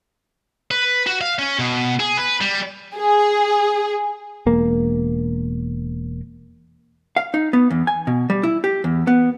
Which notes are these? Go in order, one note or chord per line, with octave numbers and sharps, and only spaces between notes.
B4
F#4
F5
C#4
B2
G#4
B4
G3
G#4
E1 A#3
F5
D#4
B3
E2
G#5
B2
G3
E4
G4
E2
B3